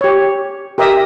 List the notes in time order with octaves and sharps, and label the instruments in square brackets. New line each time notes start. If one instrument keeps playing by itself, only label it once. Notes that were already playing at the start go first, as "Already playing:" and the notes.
[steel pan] G4 C#5
G4 A#4 D#5 E5 D#6